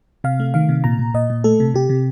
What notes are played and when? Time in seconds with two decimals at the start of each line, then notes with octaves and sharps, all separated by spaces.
0.24 C3 F5
0.40 A3
0.54 D#3 F5
0.69 C3
0.84 A#2 A#5
0.99 A#2
1.14 A#2 D#5
1.30 A#2
1.44 A3 A4
1.60 C3
1.74 C3 G4
1.89 C3